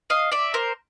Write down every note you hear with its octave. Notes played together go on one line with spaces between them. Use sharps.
D#5 F5
D5 E5
A#4 C5